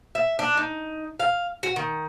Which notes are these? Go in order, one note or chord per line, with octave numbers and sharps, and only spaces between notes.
E5
D4
D#4
F5
F#4
D#3